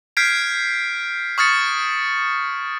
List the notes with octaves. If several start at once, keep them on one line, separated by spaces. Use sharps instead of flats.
F6 G6 G#6 B6 C7 D7
C#6 D#6 F6 G#6 A6 C#7